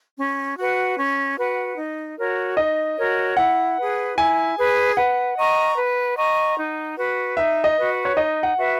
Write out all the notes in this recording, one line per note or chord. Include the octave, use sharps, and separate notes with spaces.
C#4
F#4 B4 F#5
C#4
F#4 B4 F#5
D#4
F#4 A#4 C#5
D#4 D#5
F#4 A#4 C#5
E4 F#5
G#4 B4
E4 G#5
G#4 B4
B4 F#5
D#5 A#5 C#6
B4
D#5 A#5 C#6
D#4
F#4 B4
D#4 E5
D#5
F#4 B4
C#5
D#4 D#5
F#5
F#4 B4 E5